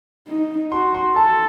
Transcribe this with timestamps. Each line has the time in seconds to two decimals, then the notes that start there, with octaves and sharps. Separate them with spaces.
0.28 D#4
0.72 F#4 C6
0.94 C6
1.16 A4 A5